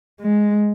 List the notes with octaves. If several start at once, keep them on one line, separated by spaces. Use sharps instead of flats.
G#3